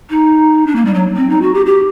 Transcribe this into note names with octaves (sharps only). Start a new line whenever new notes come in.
D#4
D4
A#3
G3
F#3
C4
D#4
F#4
G4
G4